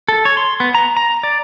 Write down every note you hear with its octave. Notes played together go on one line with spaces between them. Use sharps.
A4
C#5
C6
B3
A#5
A#5
D5